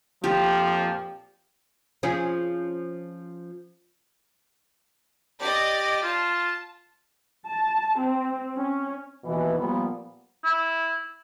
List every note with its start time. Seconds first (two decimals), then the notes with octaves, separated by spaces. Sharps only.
0.24 F2 A#2 F3 G4
2.03 F3 C#4 G#4
5.41 G4 D5 D#5
6.03 F4 A5
7.46 A5
8.00 C4
8.55 C#4
9.24 D#2 B2 E3
9.58 A#2 F3 G3 B3
10.44 E4